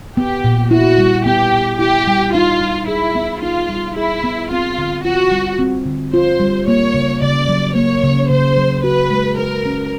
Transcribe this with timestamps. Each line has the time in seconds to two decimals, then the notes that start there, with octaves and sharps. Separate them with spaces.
0.17 B3 G4
0.44 A#2
0.71 E4 F#4
0.99 G3
1.26 B3 G4
1.52 A#2
1.79 E4 G4
2.08 G3
2.34 D#4 F4
2.61 G3
2.88 E4 G#4
3.15 B3
3.42 D#4 F4
3.69 G3
3.96 E4 G#4
4.24 B3
4.51 C4 F4
4.78 D3
5.05 F4 F#4
5.32 G3
5.59 C4
5.86 D3
6.13 F4 C5
6.40 G3
6.67 A#3 C#5
6.94 C#3
7.22 C#3 D5
7.49 F#3
7.75 A#3 C#5
8.03 C#3
8.30 C#3 C5
8.57 F#3
8.84 F#4 B4
9.11 G#3
9.38 A#4 B4
9.66 C#4